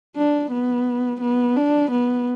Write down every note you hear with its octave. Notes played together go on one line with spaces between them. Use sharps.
D4
B3
B3
D4
B3